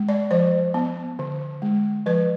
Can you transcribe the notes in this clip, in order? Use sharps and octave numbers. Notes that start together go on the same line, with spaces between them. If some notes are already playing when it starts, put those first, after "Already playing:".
Already playing: G#3
D5
F3 C5
B3
D3
G#3
F3 B4